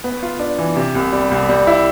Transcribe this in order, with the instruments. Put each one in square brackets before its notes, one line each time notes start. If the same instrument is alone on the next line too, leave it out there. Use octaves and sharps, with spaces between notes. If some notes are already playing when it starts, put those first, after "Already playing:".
[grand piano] B3
F4
D4
E3
C3
C2
G3
C2
G3
E4